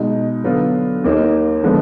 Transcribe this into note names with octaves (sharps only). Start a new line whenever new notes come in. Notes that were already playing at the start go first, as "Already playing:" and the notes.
Already playing: B2 G#3 D#4
D3 F#3 B3 F4
D#2 D#3 A#3 D#4
D3 F3 G#3 B3